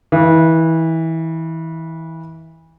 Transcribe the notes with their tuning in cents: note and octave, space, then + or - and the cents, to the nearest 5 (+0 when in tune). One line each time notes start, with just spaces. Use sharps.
E3 -25 F5 -45